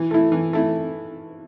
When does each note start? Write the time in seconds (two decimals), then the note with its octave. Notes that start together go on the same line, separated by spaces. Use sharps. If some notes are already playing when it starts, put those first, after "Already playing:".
Already playing: E3
0.11 A3 E4
0.32 E3
0.53 A3 E4